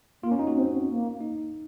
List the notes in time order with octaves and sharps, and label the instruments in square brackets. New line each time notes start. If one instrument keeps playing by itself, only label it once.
[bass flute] A#3 [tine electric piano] F4
[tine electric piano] C#4
D#4
F#4
[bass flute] C4
C4
A#3
[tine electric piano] D#4